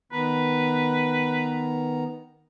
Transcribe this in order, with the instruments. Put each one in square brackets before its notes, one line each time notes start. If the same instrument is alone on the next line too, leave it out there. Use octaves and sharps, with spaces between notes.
[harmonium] D#3 B3 A#5 [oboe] B4